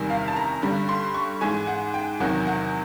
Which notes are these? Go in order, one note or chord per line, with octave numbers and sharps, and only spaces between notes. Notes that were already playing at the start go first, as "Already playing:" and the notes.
Already playing: E2 C3 D#3 G3
F5
A5
A#5
G2 D3 G3
C6
C#6
G#2 E3 G#3 G#5
F#5
G5
E2 C3 D#3 F#3 F#5
F#5